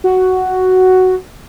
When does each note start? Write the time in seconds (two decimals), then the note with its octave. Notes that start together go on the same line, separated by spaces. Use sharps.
0.04 F#4